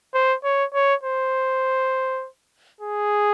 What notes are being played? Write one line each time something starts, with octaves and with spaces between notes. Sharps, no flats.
C5
C#5
C#5
C5
G#4